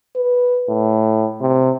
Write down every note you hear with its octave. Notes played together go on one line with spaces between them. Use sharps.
B4
A2
C3